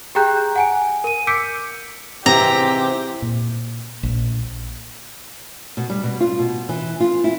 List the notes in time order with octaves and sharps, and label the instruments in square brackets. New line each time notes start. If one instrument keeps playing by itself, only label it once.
[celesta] G4 G#4 G5 A#5 F#6 G6
F#5 G#5 D7
A#4 D#7
D6 E6 G6 B6 C#7 D7
[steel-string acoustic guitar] G#2 C3 E3 [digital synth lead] C4 [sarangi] G4 [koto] A#5
[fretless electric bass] A#2
A#1
[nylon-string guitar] B2
G3
B2
F4
B2
E3
F4
E4